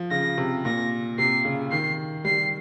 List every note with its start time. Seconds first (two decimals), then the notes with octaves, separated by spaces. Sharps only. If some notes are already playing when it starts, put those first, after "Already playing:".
Already playing: F3
0.11 C#3 A#6
0.38 C3
0.65 A#2 A#6
1.18 C3 C7
1.45 C#3
1.72 D#3 C7
2.25 G3 C7